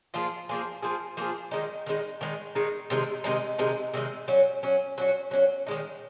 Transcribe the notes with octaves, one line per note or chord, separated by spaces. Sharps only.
F3 A#3 F4 G#4
F3 A#3 F4 G#4
F3 A#3 F4 G#4
F3 A#3 F4 G#4
D#3 G#3 D#4
D#3 G#3 D#4
D#3 G#3 D#4
D#3 G#3 D#4
C3 D#3 G#3 D#4
C3 D#3 G#3 D#4
C3 D#3 G#3 D#4
C3 D#3 G#3 D#4
F#3 C#4 F#4
F#3 C#4 F#4
F#3 C#4 F#4
F#3 C#4 F#4
D#3 G#3 D#4